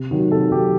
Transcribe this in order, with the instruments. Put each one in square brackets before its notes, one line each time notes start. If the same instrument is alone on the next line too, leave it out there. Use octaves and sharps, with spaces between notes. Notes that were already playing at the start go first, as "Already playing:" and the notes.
Already playing: [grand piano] C3
D#3 F#3
C3 A4
D#3 F#3 G4